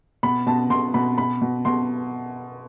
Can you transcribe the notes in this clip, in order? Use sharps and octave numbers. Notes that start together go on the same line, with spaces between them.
B2 B5
B2 A5
B2 C6
B2 B5
B2 B5
B2
B2 C6